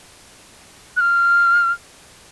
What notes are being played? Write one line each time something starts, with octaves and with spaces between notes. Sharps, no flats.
F#6
F6